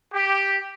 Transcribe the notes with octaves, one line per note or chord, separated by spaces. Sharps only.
G4